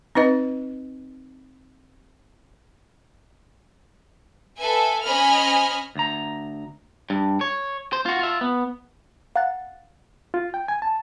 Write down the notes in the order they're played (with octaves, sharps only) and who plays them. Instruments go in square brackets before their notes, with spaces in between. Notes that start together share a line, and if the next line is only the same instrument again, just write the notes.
[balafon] C4 D#4 B4 D#5
[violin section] A4 B4 E5 G#5
C#4 C5 D#5 G#5 B5 F6
[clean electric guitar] D2 A#5
[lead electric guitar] G2
C#5
C5
F4 F#4
F4 E5
B3
[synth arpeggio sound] F5 F#5 A#5 F#6 A6
[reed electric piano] F4
G5
G#5
A5